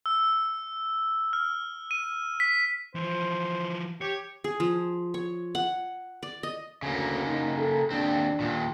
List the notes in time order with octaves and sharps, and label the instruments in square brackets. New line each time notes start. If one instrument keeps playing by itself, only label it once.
[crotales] E6
F6
D#7
B6
[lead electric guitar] E3 F3 [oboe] C5
[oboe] G4 [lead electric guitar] C#5
[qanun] G#4
F3
C#5
F#5
D5
D#5
[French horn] D2 [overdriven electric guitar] C#3 A#3
[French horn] D#4
A4
[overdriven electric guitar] D#2 C4 [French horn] D4
[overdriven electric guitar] D#2 A#2